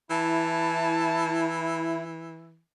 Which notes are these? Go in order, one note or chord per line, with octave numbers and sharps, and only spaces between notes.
E3 E4 A5